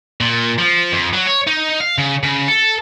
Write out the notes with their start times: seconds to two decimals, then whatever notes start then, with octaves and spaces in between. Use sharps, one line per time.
0.21 A#2
0.58 F3
0.92 F2
1.13 F#3
1.27 C#5
1.47 D#4
1.80 F5
1.98 C#3
2.23 C#3
2.48 A4